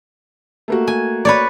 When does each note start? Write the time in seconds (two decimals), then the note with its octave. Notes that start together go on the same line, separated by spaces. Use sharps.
0.68 A3 A#3 F#4
0.87 G#5
1.25 B4 C#5 D5